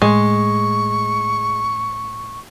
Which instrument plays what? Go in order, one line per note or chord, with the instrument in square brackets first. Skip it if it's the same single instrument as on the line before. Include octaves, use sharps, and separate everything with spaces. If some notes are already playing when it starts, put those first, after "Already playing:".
[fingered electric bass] A2 [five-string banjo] G#3 [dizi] C#6